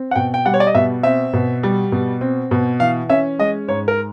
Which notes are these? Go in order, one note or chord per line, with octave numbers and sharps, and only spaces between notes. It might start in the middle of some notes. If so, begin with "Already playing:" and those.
Already playing: C4
F#5
B2 G5
G5
G3 F#5
C#5
D5
D#5
B2 E5
C4 E5
B2
G3
B2
C4
B2
E3 F5
C#4 E5
G#3 D#5
G#2 C#5
A#4